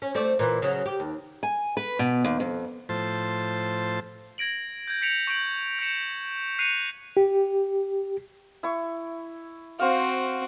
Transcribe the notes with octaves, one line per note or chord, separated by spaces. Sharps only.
C#4
A3 C4 D5
A#2 E3
C#3 F#3
G4
D#2
G#5
B4
B2
D#2
F2
A2 F3 C5 A5
G#6 A#6 D7 F#7
G6 G#6
G6 B6 C#7 D7 F7
C#6 G6 D7 F#7
G6 B6 C#7 E7
F#6 C7 C#7 D#7 F7
G4
E4 C#6
C4 F#4 C5 F5